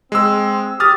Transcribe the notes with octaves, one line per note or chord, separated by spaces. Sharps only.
G#3 C4 E6
G4 D#6 F6 A6